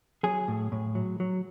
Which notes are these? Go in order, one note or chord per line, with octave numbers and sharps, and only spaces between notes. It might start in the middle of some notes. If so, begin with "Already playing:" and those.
F#3 G#4
A2
A2
F#3
F#3